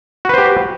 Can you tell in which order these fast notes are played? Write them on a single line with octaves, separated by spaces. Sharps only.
F#4 B4 C5 G4